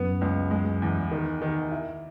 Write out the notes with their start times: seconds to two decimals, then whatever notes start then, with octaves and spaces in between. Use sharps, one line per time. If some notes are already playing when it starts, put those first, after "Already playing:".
Already playing: F#2 B3
0.21 C#2
0.51 G#3
0.82 E2
1.11 D#3
1.41 D#3
1.71 E4